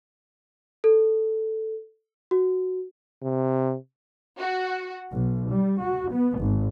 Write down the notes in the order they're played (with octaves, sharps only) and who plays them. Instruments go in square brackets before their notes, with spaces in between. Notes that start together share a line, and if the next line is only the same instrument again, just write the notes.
[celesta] A4
F#4
[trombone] C3
[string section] F#4
B1
G3
F#4
B3
G#1